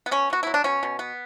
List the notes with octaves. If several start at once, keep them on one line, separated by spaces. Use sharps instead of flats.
B3
B2 C#4
B3 F#4
F#3 E4
D4
B2 C#4
B2
B3